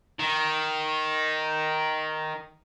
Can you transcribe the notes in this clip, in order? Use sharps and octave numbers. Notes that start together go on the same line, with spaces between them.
D#3